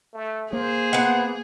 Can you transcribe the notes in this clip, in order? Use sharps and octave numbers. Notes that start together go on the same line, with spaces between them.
A3
A#3 G#4 C5
B3 F#5